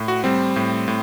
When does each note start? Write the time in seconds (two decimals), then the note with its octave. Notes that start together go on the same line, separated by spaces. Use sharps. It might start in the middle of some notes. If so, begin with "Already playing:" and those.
Already playing: A2
0.08 F#4
0.24 G3 C4
0.56 A2
0.88 A2